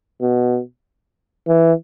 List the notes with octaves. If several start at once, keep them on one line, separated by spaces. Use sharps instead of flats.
B2
E3